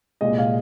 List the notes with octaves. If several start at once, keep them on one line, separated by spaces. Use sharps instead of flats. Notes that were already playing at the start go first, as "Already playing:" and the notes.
C2 A#2 G#3 D#5
F5